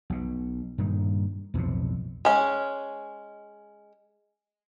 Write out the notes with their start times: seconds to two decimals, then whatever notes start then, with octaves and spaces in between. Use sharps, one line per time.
0.10 B1 B2
0.78 G2 A#2 D#3
1.54 B1 F2 A2 C3
2.25 G#3 C#4